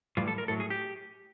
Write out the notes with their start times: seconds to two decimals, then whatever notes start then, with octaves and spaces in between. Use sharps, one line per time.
0.17 A2 E3 G3 F4
0.28 A4
0.38 A#4
0.48 A2 F#3 A4
0.60 G#4
0.70 G4